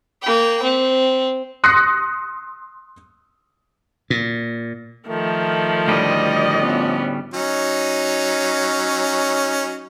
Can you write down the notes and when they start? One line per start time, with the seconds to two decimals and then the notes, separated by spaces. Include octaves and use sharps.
0.22 A#3 G5
0.63 C4
1.64 C6 D#6 F#6 A#6 C7 C#7
4.10 A#2
5.08 D#3 F3 A3
5.87 D2 A2 G3 D5 D#5
6.61 F3 B3 C#4
7.34 F#3 C#4 D#4